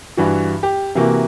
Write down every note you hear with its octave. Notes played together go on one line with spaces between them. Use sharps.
G2 E3 F#4
G4
C3 E3 A#3 F#4